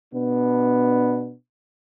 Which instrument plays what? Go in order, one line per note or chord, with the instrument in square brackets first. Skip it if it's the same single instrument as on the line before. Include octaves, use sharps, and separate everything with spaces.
[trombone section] B2 B3 D4